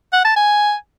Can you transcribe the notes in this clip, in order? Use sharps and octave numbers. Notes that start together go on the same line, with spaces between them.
F#5
A5
G#5